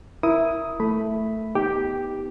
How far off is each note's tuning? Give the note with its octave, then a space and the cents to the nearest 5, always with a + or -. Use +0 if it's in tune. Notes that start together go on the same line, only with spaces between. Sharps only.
E4 +0 A#4 +10 D#6 +10
A3 +0 E5 +0 B5 +0
B3 +0 D#4 +25 G4 +0